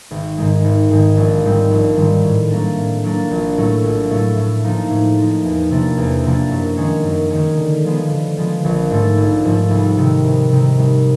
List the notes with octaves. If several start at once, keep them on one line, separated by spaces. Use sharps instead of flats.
G#1
G#2 D#3 G#3
G#1
G#2 D#3 G#3
A#1
G#2 D#3 G3 C4
A#1
G#2 D#3 G3 C4
A2
F#3 A#3 D4
A2
F#3 A#3 D4
A#1
A2 F#3 A3
A#1
A2 F#3 A3
A2
F3 A#3 D#4
A2
F3 A#3 D#4
E2
C3 F3 A#3 D4
E2
C3 F3 A#3 D4
F#2
D#3 G#3 C#4
F#2
D#3 G#3 C#4
D3
F3 G#3 B3
D3
F3 G#3 B3
A#1
G#2 F3 A3
A#1
G#2 F3 A3
C2
C3 D#3
C2
C3 D#3
C2